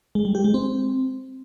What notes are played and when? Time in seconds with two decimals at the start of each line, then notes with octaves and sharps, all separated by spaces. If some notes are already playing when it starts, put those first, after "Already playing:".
0.15 G#3
0.25 G3
0.35 G4
0.44 G#3
0.54 C4